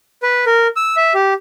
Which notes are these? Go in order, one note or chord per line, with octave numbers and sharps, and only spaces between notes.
B4
A#4
E6
E5
G4